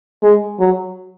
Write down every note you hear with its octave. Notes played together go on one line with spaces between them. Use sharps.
G#3
F#3